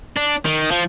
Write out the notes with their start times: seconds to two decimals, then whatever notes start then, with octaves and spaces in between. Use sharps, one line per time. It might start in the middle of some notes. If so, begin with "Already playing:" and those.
0.16 D4
0.45 D#3
0.71 F3